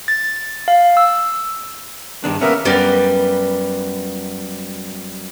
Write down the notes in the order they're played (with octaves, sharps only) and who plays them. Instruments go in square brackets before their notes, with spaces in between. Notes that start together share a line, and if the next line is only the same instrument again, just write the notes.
[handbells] A6
F5
E6
[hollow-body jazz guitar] G2 D#3 D4
[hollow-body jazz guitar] A#3 B3 C#4 [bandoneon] A#4 E5
[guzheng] F#2 G3 B3 D5 A#5